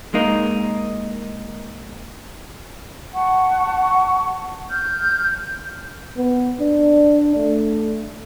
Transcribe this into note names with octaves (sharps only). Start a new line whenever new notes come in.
G#3 A#3 D#4
F#5 A5 C#6
F6 G6
B3
D4
A3